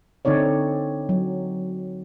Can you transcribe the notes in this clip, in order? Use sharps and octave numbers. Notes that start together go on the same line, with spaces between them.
D3 C4 D#4 C#5 D5
F#3